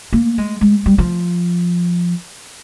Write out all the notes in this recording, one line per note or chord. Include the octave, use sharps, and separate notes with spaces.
A#3
G#3
G#3
G3
F3